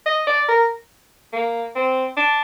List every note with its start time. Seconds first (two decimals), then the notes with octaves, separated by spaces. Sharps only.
0.06 D#5
0.27 D5
0.48 A#4
1.33 A#3
1.75 C4
2.17 D4